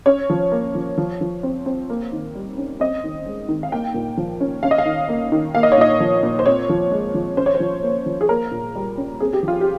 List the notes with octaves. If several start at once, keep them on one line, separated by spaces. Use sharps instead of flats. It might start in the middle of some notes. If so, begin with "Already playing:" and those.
C#4 C#5
F3
A#3
F3
F3
F3
C4
C4
A#3
D#3
G3
C#4
C4 D#5
D#3
G#3
D#3
F5
A#3 G5
A#2
F3
C#4
C#4 F5
D#5
F5
D#3
A#3
D#3
A#3 F5
D#5
C#5
A#2 D#5
F3
A#2
C5
C4 C#5
F3
G#3
F3
C#4 C5
C#5
C5
F3
A#3
F3
G#4
A#3 A#4
A#2
G3
C#4
C4 G#4
G4
F3
F4
G4